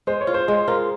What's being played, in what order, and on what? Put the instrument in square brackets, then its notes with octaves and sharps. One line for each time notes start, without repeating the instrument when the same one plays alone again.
[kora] G#3 [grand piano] C5
[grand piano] C#5
[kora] F4
[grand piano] C5
[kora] G#3
[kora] F4 [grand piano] A#4